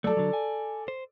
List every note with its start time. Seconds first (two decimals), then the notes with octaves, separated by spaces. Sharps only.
0.04 F#3 G#3 A3 A4 D5
0.17 D3 F#3
0.33 G#5
0.88 C5